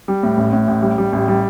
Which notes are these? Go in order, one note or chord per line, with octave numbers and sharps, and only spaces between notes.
G3
A2
A1
A2
A1
G3
G3
A1
G3